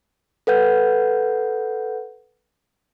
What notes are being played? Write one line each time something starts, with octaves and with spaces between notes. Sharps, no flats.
A4 B4 F#5 G6